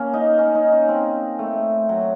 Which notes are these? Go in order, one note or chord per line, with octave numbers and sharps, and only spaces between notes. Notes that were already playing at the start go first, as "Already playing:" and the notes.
Already playing: A#3 C#4
D#4
C#4
D#4
C#4
C4
A3
F#3